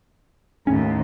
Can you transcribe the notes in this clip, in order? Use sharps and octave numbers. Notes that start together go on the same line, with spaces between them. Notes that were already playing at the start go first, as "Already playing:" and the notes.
D#2 A2 C#4